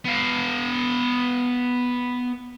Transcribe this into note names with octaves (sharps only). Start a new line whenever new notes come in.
B3 F5